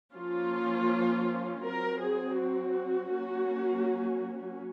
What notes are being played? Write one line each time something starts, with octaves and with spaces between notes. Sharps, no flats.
F3 A#3 C#4 F4
F#3 C4 A#4
G#4
F#4
F#3 A#3 C#4